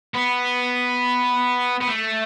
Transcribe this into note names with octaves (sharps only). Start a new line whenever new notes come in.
B3
B3
A3